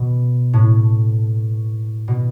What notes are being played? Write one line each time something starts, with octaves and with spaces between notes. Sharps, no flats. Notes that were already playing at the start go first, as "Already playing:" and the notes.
Already playing: B2
A2
B2